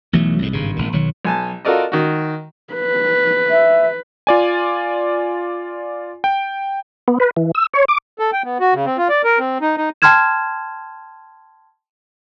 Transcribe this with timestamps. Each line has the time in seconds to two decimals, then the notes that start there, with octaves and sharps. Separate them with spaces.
0.13 B1 E3 F#3 A3
0.39 C2 F2 G#2
0.53 G#1 G2 C#3
0.76 G#1 A#2
0.93 B1 D#3 F#3
1.25 B1 G#5 A5
1.65 F4 F#4 A4 A#4 D5 D#5
1.92 D#3 F#4
2.74 B4
3.51 E5
4.27 F4 D5 G#5
6.24 G5
7.08 B3
7.20 B4
7.37 E3
7.55 E6
7.74 C#5
7.88 D6
8.19 A4
8.33 G5
8.44 B3
8.60 F#4
8.74 C#3
8.86 C4
8.98 F4
9.09 D5
9.24 A#4
9.39 C4
9.61 D#4
9.77 D#4
10.02 G5 A5 C6 F6 G#6 E7